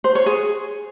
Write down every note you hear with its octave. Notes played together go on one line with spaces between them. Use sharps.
C5
C#5
G#4